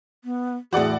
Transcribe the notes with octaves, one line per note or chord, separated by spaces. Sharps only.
B3
E2 A2 F#4 G#4 D5 F#5